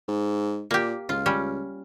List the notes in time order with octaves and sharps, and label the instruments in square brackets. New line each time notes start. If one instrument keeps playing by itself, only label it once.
[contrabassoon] G#2
[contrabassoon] A#2 [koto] A#3 G4
[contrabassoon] C#2 [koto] F4
[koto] G3 C#4